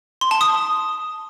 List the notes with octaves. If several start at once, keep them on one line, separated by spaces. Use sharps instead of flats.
C6
A5
D#6